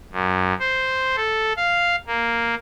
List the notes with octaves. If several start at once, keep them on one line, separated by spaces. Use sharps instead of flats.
F#2
C5
A4
F5
A#3